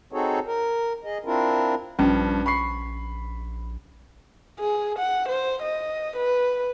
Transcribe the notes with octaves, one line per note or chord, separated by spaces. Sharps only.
C4 D#4 F#4 G#4 A4 C#5
A#4
G#4 D#5
C4 D4 E4 F4 A#4
A#1 G2 F3 C#4
B5 C#6 C7
G#4
F#5
C5
D#5
B4